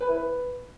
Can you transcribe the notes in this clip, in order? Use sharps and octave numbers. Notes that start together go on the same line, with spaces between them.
B4
E4
B4